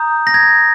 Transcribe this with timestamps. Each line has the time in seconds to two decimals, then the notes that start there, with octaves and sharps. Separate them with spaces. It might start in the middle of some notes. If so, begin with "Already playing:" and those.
Already playing: A#5 D#6 G6
0.27 A#6
0.34 G#6